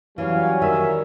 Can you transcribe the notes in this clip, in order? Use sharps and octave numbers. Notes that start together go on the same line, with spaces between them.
E3 F#3 G3 C#4 F5
D#3 E5